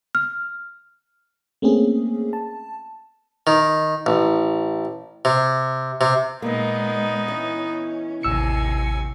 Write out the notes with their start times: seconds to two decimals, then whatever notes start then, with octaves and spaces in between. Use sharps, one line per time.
0.15 F6
1.62 A3 A#3 C4 C#4 G#4
2.33 A5
3.47 D#3
4.06 A1
5.25 C3
6.01 C3
6.42 A#2 G#3 A#3 B3 D#4
7.28 E3 C#4
8.23 A1 D#2 C3 G#5 E6 C#7